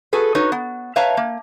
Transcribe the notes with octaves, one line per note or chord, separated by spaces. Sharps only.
F#4 G#4 A4 B4
D#4 F#4 B4 C#5
B3
B4 C#5 E5 F5 A5 A#5
A#3